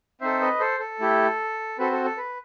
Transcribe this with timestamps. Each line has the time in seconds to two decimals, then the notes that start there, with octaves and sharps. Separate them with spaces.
0.21 C4 D#4 A4 C5 E5
0.41 B4 D#5
0.60 A4 C5
0.80 A4
1.00 A3 E4 G4
1.78 C4 F#4 A4 B4
1.92 A4
2.05 A4
2.18 B4